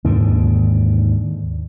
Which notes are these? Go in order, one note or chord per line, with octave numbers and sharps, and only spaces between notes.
D#2 G#2 D3